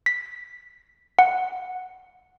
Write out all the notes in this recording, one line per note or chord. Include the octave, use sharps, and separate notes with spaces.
B6
F#5